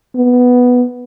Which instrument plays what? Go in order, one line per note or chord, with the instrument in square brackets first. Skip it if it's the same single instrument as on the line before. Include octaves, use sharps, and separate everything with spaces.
[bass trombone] B3